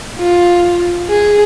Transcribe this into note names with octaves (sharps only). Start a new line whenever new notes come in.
F4
G#4